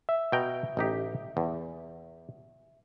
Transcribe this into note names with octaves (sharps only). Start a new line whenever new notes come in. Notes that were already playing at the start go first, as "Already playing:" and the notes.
E5
B2 G5 A#5
A1 D#4 G4
E2